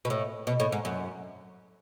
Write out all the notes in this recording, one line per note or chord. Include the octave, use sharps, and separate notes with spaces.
B2
A2
B2
A2
G#2
F#2